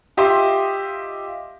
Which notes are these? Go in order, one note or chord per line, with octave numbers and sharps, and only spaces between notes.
F4 G4 D#5 E5 C6